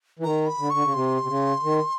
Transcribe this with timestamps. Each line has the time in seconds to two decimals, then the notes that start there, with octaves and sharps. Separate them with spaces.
0.19 E3
0.23 D#3 A#5
0.46 B5
0.59 D3
0.70 D3 C#6
0.83 C#3
0.93 C3 C6
1.23 C3
1.28 C#3
1.63 D#3